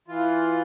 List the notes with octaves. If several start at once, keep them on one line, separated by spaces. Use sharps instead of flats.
E3 F4